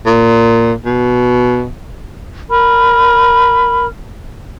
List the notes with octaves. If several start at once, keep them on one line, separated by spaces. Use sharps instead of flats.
A#2
B2
A#4 B5 F6